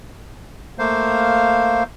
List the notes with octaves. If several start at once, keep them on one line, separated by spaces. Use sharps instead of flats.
A3 A#3 C5 F5